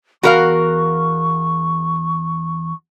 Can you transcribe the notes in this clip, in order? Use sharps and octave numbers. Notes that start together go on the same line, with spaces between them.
E2 F#4 A#4 F5 B5 C#6